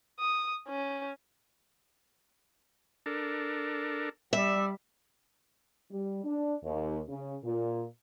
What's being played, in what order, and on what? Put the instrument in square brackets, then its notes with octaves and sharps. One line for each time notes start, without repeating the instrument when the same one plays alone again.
[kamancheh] D#6
C#4
[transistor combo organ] D4 A4 A#4
[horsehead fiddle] G3 D5 [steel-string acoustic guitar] E5
[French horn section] G3
D4
D#2
C#3
A#2